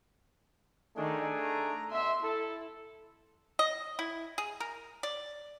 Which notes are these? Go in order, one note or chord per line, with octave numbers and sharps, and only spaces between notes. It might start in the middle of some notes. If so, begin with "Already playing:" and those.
D#3 A3 D4 G#4
A#5
B2 E5 C6
E4 A4
D#5
E4
G#4
A#4
D5